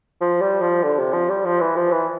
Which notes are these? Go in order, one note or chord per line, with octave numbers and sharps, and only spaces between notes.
F3
G3
F3
D3
C3
F3
G3
F3
E3
F3
E3